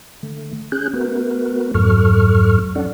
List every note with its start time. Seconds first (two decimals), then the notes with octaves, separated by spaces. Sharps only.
0.23 D3 A3
0.72 C#4 G#4 F#6 G6
0.93 A3 B3 F#4 A#4 B4
1.74 F2 G#2 F#3 A4 C#6 F6
2.75 F#3 C#4 D4 A4 D5 F#5